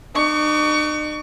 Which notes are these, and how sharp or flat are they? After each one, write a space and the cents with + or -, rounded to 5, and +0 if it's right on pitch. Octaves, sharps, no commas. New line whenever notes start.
D#4 -45 C#6 +30